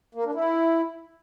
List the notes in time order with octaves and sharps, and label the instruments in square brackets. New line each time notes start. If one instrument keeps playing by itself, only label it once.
[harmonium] A#3
D4
E4